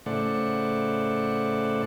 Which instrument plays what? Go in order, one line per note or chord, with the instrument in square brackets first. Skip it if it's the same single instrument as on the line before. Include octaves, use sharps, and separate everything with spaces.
[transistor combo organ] A2 C#3 A3 C5 D5 F#5